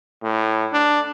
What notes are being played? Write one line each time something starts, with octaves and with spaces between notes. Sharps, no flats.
A2
D4